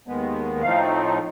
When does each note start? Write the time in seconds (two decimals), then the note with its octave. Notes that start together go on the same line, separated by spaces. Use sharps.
0.07 D#2 D#3 G#3 B3
0.62 A2 F3 A3 C4 D#4 F5